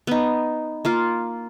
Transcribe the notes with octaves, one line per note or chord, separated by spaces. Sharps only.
B3 D#4
A#3 F4 F5